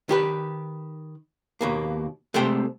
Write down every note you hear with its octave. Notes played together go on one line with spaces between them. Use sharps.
D#3 G4 B4
D#2 B2 A#3
C3 G#3 A3 A4 C5 G5